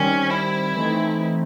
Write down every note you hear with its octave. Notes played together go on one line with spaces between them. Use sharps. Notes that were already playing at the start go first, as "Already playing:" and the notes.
Already playing: D#3 G3 C4 C#4
E4
E3 A3 C4 D#4